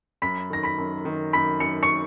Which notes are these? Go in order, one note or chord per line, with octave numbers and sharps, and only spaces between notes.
F#2 B5 B6
D#3 A#6
B5 B6
F#2
D#3
F#2 B5 B6
F#2 C#7
C#6 C#7